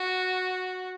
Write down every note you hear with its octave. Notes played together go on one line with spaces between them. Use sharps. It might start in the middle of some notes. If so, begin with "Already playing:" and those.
Already playing: F#4